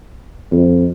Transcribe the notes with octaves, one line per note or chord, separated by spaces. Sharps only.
F2